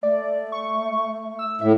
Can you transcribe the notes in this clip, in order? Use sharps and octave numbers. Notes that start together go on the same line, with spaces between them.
A3 D5
C#6
E6
A2 E5